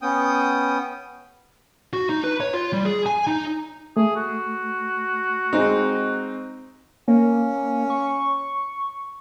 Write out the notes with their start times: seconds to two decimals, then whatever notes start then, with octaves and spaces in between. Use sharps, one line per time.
0.02 B3 C#4 G5 D#6
1.93 F#4
2.10 D#4
2.24 B4
2.40 C#5
2.54 F4
2.73 G3
2.85 G#4
3.06 G#5
3.27 D#4
3.97 A3 G#4
4.16 F#4
5.53 G#3 C4 D#4
7.08 A#3 C#4
7.90 C#6